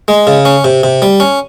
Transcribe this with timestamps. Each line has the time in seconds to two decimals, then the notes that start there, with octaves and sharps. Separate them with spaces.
0.08 G#3
0.27 C#3
0.45 C#4
0.64 C3
0.83 C3
1.02 G3
1.20 C#4